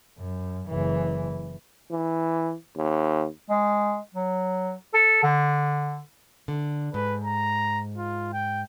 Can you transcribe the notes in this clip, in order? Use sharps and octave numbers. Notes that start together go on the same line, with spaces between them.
F#2
F#1 E3
E3
D#2
G#3
F#3
A4
D3
D3
G#2 B4
A#5
F4
G5